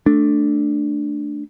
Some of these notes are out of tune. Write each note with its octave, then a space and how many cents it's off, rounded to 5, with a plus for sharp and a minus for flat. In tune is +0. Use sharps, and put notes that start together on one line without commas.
A3 +0 D4 +0